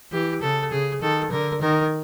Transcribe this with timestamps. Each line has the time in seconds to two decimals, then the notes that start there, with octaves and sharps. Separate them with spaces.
0.12 E3 G4
0.42 C#3 A4
0.72 C#3 G#4
1.02 D#3 A4
1.31 D3 A#4
1.61 D#3 A#4